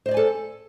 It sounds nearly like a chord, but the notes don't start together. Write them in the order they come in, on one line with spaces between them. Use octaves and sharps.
C5 D#5 D5 G#5 A4